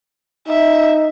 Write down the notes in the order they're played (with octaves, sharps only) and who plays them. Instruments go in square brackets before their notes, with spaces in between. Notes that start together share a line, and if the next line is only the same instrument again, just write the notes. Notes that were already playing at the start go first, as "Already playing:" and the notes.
[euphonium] D#4 [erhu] E5